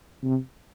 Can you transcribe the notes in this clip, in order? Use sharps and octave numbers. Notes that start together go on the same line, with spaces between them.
C3